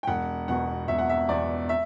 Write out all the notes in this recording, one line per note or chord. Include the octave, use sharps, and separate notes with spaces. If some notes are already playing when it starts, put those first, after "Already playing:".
G5
E1 F#5
E2 B2 F#5
E1 E5
F#5
E5
E2 B2 D5
E5